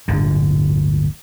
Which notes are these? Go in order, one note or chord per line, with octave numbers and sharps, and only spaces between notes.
D1 G1 A#2 D3